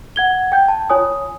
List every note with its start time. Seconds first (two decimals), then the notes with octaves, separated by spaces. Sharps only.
0.16 F#5 G#6 G7
0.52 G5 G6
0.68 A5
0.90 F4 C#5 G#5 D#6